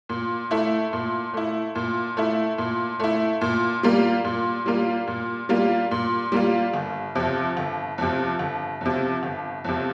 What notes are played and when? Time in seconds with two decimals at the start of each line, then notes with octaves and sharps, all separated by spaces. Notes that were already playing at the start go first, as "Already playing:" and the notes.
0.09 A#2
0.51 A3 E4
0.93 A#2
1.34 A3 E4
1.75 A#2
2.17 A3 E4
2.58 A#2
3.00 A3 E4
3.41 A#2
3.83 G3 A#3 F4
4.24 A#2
4.66 G3 A#3 F4
5.07 A#2
5.49 G3 A#3 F4
5.91 A#2
6.32 G3 A#3 F4
6.74 G1
7.15 F2 C3
7.57 G1
7.98 F2 C3
8.39 G1
8.81 F2 C3
9.23 G1
9.64 F2 C3